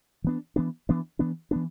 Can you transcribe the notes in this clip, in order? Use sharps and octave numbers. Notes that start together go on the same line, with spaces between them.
E3 B3 D4
E3 B3 D4
E3 B3 D4
E3 B3 D4
E3 B3 D4